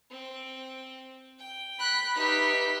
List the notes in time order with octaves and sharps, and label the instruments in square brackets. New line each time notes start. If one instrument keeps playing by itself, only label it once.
[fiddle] C4
G5
[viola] B5 [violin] F#6 B6
[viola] D#4 B4 [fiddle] G4 E5 [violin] B6